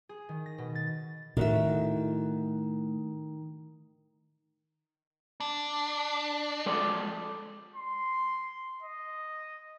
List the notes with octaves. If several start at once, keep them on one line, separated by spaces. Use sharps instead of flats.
G#4
D#3
A#6
B2
A6
A2 D#3 F#4 E5
D4
G#3 A4 D5
C6
D#5